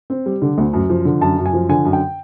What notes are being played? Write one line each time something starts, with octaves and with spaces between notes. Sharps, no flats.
C4
G3
D3
D2
F#2
F3
D3
F#2 A5
F#2
G#5
F3
D3 G#5
F#2
G5